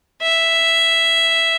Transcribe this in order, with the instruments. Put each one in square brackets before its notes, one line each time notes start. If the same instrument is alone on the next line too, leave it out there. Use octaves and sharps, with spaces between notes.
[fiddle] E5